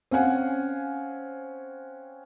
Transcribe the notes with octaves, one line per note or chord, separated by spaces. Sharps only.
C4 C#4 F5 F#5 G#5